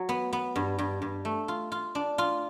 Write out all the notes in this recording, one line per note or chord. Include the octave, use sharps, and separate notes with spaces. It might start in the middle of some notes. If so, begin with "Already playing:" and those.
Already playing: F#3
B3
B3
G2
G2
G2
A3
F4
F4
D4
F4